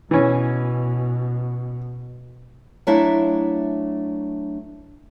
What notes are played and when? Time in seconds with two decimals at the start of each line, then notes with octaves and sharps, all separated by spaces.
0.11 B2 E3 C#4
2.87 F#3 A3 D4 E4 E5 F5